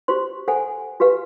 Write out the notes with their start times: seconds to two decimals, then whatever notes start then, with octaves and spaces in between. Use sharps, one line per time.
0.08 F#4 G4 C5 C6
0.48 A4 C5 F#5 G#5
1.00 F#4 G4 B4 F5